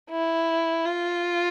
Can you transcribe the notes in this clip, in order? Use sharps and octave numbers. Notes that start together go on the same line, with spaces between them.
E4
F4